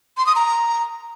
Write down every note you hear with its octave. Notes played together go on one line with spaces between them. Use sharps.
C6
D#6
A#5